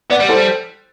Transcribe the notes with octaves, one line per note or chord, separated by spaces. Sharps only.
B3 D5 F#5
G3
A4 C5